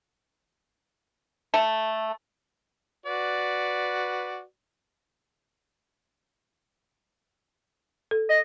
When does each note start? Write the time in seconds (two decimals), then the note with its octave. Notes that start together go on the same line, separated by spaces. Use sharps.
1.54 A3 A4
3.06 F#4 B4 D5
8.11 A4
8.30 D#5